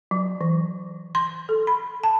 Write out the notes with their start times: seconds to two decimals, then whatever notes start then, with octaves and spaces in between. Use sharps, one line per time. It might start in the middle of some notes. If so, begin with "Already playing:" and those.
0.11 F#3
0.41 E3
1.15 C6
1.49 A4
1.67 B5
2.03 A5